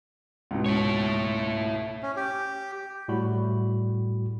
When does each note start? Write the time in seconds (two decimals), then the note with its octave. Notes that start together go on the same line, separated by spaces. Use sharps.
0.51 C#2 G#2 B2
0.66 E4 C#5
2.03 C#4
2.16 G4
3.08 A2 G3 F#4 B5